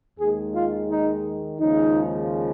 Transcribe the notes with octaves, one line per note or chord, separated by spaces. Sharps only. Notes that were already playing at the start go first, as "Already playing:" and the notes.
D#2 D#3 G#3 G#4
F4
D#4
D#2 C#3 F3 G#3 D#4